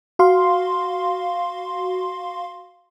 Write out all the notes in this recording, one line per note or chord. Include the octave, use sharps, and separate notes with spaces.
F#4 F5 C6